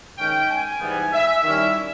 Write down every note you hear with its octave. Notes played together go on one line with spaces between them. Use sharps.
D#3 G#3 C#4 G5
G#5
G#2 E3 G3 B3
E5
D#3 G3 C#4 E4 E5